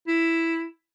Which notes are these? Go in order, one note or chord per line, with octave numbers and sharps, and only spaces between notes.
E4